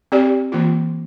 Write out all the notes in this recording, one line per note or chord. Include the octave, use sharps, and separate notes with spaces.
C4 G4 D5
E3 A#3 F4